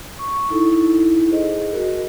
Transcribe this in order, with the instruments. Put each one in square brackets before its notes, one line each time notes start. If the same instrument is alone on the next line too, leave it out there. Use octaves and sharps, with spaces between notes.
[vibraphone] C#6
D#4 E4 A4
G#4 C5 D#5
F#4 A#4